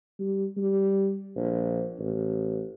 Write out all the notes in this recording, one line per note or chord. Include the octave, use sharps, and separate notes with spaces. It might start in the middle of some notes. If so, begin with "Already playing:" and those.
G3
G3
A#1
A1